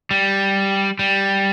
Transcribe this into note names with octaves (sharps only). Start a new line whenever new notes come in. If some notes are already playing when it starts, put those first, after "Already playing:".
G3
G3